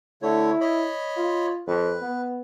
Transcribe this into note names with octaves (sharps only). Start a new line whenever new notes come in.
D3 A3 E4 C#5
C#5 D#5 B5
F4
F2 B4
B3